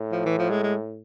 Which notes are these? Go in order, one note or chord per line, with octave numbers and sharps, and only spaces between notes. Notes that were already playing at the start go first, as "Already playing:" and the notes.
Already playing: A2
F3
E3
F3
G#3
G#3